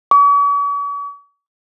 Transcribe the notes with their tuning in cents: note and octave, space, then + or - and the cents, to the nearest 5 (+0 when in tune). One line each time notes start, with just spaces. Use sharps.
C#6 +45